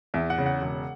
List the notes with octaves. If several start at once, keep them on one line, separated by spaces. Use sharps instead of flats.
E2 E5
F#5
C#3
F#5
E1